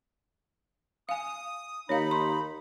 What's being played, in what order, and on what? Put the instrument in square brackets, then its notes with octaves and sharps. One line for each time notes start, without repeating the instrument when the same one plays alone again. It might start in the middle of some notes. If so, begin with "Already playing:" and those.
[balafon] F5 G#5 [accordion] D#6
[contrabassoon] D#2 [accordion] D#4 B5 [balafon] C#5 F5
[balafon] C6